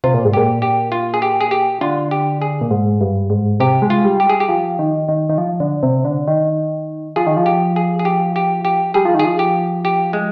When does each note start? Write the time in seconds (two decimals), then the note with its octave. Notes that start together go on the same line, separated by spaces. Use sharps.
0.04 C3 F4
0.14 A#2
0.25 G#2
0.33 A#2 G4
0.62 G4
0.92 F4
1.14 G#4
1.22 G4
1.41 G#4
1.51 G4
1.81 D3 F4
2.11 G4
2.42 G#4
2.61 A#2
2.71 G#2
3.01 G2
3.30 G#2
3.60 C3 G4
3.82 G#3
3.90 F4
4.04 G3
4.20 G4
4.27 G3 G#4
4.40 G4
4.49 F3
4.79 D#3
5.08 D#3
5.29 D#3
5.38 F3
5.60 D3
5.83 C3
6.05 D3
6.28 D#3
7.16 F3 G#4
7.27 D#3
7.37 F3
7.46 G4
7.76 G#4
7.99 G#4
8.05 G4
8.36 G4
8.65 G4
8.94 G3 G#4
9.05 F3
9.15 D#3 G#4
9.25 F3
9.39 G4
9.85 G4
10.13 G#3